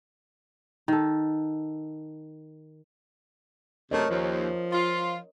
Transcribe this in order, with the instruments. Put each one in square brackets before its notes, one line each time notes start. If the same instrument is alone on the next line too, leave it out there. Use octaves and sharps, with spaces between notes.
[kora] D#3 A4
[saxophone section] F#2 C3 A3 [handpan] A#4 C#5 D#5
[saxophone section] D#2 [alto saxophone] F3
[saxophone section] F4